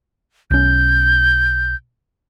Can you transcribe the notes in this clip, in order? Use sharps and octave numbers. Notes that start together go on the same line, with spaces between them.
B1 C#4 G6